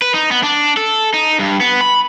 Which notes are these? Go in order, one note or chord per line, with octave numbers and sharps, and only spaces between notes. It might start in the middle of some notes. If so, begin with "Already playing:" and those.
B4
D#4
B3
D4
A4
D#4
G2
B3
B5